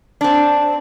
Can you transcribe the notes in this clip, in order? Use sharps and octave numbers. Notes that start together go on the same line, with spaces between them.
C4 D4